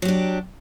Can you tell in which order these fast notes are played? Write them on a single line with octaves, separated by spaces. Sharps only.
F#3 G4 D4